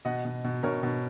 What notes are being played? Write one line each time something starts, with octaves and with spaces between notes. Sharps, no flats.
B2 D#5 F#5
B2
B2
B2 A#4 C#5
B2